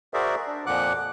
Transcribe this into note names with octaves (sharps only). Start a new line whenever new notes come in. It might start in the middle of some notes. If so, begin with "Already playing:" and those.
F#4 G#4 A#4 C5 D5 E5
D4
F2 A#2 F3 F#5 D6 F#6